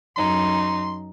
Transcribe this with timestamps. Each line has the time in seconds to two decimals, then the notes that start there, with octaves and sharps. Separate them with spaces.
0.16 F#2 D#4 C6